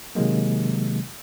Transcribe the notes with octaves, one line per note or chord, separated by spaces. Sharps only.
C3 D#3 F#3 G#3 A#3